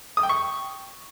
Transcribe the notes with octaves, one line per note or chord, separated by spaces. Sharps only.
D#6
G5
C#6